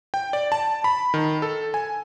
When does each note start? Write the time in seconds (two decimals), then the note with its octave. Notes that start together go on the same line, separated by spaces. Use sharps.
0.14 G5
0.33 D5
0.52 A5
0.84 B5
1.14 D#3
1.42 A4
1.74 G#5